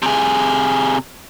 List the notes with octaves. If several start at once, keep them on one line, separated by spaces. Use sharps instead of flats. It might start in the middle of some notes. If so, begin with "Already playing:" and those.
C3 G#4